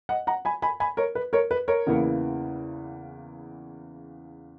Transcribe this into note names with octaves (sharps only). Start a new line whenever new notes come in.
D#5 F#5
F#5 A#5
G#5 B5
G#5 B5
G#5 B5
A#4 C#5
B4
A#4 C#5
B4
A#4 C#5
E2 C#3 E3 A#3